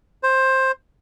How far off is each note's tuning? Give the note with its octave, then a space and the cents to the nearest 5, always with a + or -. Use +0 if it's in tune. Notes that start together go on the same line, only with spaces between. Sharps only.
C5 +15